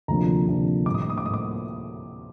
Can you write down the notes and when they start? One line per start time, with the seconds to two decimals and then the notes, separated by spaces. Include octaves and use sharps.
0.08 D2 C3 F3 A#3 D4 A#5
0.47 D2 C3 F3 A#3 D4
0.86 A2 G3 A#3 D6
0.94 D#6
1.02 D6
1.10 D#6
1.18 D6
1.24 A2 G3 A#3 D#6
1.34 D6